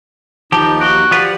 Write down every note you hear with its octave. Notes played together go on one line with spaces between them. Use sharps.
D#2 F3 D#4 G4 A5
F#4 D7 G7
F3 F4 G4 B4 D5 F#5